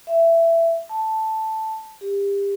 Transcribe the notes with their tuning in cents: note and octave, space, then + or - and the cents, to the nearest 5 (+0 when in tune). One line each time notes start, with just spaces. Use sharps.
E5 +15
A5 +0
G4 +30